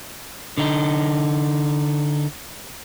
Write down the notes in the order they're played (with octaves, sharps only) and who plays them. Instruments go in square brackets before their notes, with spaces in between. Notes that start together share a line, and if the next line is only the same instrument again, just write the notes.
[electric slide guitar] D3 D#4